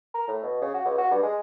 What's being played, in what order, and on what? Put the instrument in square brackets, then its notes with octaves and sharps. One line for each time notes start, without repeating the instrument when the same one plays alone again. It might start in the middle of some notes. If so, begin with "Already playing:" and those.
[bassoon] A#4
A2
B2
C#3
F#4
C#2
F#4
G2
G#3